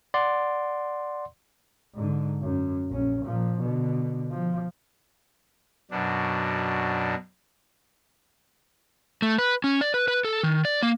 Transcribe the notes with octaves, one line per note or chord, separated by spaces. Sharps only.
D5 F#5 C6
G#2 D3
F#2
A#1 C#4
A#2 F3
B2 D3
F3
F#2 B2 D4
A3
B4
C#4
D5
B4
B4
A4
D#3
D5
A#3